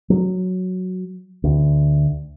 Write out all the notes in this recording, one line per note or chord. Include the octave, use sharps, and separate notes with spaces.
F#3
D2